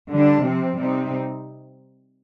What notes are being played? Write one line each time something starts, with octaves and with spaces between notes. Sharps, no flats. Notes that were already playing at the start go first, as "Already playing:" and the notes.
D3 G3 D4
C3 F3 C4
C3 G3 C4 D#4